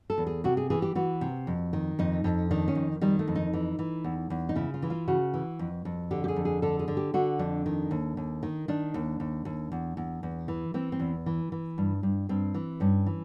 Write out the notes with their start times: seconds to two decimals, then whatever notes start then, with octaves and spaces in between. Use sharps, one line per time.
0.10 A4
0.18 E2
0.27 G#4
0.44 C3 F#4
0.57 G#4
0.70 E3 G#4
0.82 G4
0.95 E3 F#4
1.21 C3
1.47 F2
1.73 D#3
1.99 F2 D#4
2.24 F2
2.51 D#3 D4
2.68 C#4
2.75 F2
3.01 D#3 G3
3.19 A3
3.28 F2
3.35 D#4
3.53 E3
3.79 E3
4.04 E2
4.30 E2
4.49 D#4
4.56 C#3 E4
4.74 F4
4.82 E3
4.90 F4
5.08 C#3 F#4
5.34 E3
5.59 F2
5.85 F2
6.11 D3 G4
6.24 G4
6.28 G#4
6.36 F2
6.45 G#4
6.62 D3 A4
6.79 G#4
6.88 D3
6.97 G4
7.14 D3 F#4
7.39 F2 D4
7.66 D#3
7.91 D#2
8.17 D#2
8.43 D#3
8.68 D#3 D4
8.94 D#2
9.20 D#2
9.45 D#2
9.72 E2
9.97 E2
10.23 E2
10.48 E3
10.74 E3 C4
10.92 C4
11.00 E2
11.26 E3
11.52 E3
11.78 G2
12.03 G2
12.29 G2 C4
12.54 E3
12.80 G2 C#4
13.06 E3